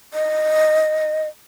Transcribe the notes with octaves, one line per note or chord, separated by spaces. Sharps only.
D#5